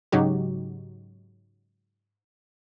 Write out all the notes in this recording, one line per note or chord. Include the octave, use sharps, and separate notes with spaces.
G#2 C#3 F#3 D#4 F#4 G4